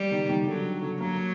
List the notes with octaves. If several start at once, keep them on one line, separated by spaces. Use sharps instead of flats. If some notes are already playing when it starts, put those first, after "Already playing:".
Already playing: G3
D#3
D#3
D3 F#3
D3
F#3 A#3